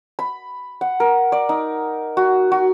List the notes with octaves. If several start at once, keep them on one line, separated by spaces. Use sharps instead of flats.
B5
F#5
A#4
D5
D#4
F#4
F#4